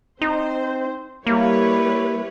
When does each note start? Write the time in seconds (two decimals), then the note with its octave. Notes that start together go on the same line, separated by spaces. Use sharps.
0.21 C4 D#4 C5
1.27 G3 A#3 E4 B4 C#5